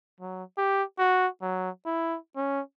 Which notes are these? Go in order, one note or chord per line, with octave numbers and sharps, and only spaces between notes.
F#3
G4
F#4
F#3
E4
C#4